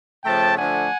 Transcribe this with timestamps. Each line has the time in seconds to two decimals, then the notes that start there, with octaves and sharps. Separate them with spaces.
0.25 C#3 F3 A3 G5 A5
0.55 D3 F3 A3 D4 F#5 G#5